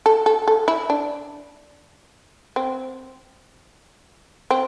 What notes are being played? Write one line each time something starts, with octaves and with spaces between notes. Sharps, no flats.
A4
A4
A4
E4
D4
C4
C4